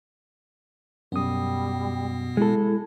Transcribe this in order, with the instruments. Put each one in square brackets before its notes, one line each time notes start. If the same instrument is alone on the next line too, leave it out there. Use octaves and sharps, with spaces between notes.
[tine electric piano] F#2 D#6 [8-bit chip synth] B2 B3 [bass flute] G3
[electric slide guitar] G#3 A4 [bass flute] E4